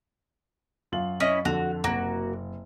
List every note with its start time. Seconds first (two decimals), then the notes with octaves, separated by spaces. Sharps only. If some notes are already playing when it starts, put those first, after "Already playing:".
0.92 F#2 F4 F#7
1.20 C#4 E4 D#5
1.45 F2 D3 F#4 F7
1.84 F#1 C3 A#3 F#4